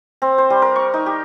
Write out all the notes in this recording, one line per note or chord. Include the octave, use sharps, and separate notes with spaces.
C4
C5
G3
A#4
C#6
D#4
G4